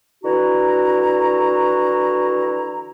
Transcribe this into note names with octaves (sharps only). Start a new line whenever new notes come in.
D3 E3 E4 F#4 A#5